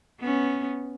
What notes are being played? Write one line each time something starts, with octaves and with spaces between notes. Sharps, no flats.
B3 C#4